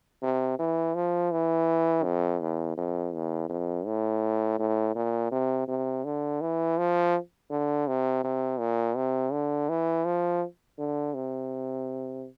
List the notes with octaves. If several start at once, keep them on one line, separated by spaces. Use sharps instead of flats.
C3
E3
F3
E3
F2
E2
F2
E2
F2
A2
A2
A#2
C3
C3
D3
E3
F3
D3
C3
C3
A#2
C3
D3
E3
F3
D3
C3